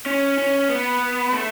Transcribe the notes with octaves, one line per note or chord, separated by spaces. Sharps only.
C#4
C#4
B3
A3